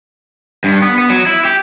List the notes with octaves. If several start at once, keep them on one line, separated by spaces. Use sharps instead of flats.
G2
B3
B3
F#3
E4
G4